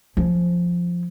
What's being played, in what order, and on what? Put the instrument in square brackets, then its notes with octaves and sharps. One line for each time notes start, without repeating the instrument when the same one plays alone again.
[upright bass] F3 C#4